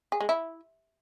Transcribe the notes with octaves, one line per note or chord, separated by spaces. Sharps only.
G#4
G#3
E4